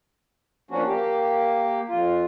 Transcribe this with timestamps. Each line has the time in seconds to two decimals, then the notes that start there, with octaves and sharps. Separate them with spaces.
0.71 F3 A#3 C#4 D4 F#4
0.87 A#3 G4
1.89 F2 F4